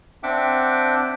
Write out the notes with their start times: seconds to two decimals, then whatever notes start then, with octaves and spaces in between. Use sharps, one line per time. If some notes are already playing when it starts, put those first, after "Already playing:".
0.23 C4 D4 E5 F#5 G5 D6